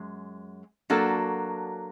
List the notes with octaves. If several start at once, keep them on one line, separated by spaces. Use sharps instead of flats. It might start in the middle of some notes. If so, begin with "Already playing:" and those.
Already playing: F#2 G#3
F#3 A#3 D4 F#4 A4